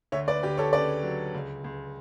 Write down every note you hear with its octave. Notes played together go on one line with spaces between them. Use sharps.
D2 C#5 E5
B4 D5
D2 G4 B4
A4 C#5
C#3 B4 D5
F#3
C#2
C#2